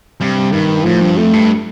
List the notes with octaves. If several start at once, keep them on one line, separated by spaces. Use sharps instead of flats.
G2 C3
G2 D#3
A2 F3
G2
F2 A3
G2